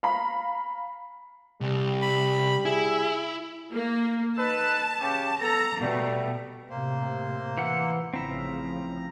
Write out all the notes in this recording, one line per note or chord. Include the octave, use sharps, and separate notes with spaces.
F5 A#5 B5
C2 C3 G3
B5
E4 G#4
A#3
D#4 A4 B4 A5
C#3 G4
B3 A4 A#5
B2 G3 A3
A2 C3 A#3 C5
E3 F#5
A1 C#3 F3 C4 E4 A#5